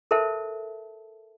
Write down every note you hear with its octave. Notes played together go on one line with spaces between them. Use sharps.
A4 A#4 C5 E5 A5